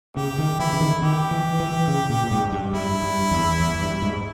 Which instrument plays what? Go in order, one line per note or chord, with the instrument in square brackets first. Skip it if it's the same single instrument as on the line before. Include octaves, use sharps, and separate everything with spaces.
[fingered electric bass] C#3 [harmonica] G4
[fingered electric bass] D#3
[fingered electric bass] E3 [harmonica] E4
[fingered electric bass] C#3
D#3
[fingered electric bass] D#3 [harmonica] G4
[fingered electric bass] E3
E3
C#3
A#2
G#2
G2
[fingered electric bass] G2 [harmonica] E4
[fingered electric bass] G2
E2
E2
G2
G#2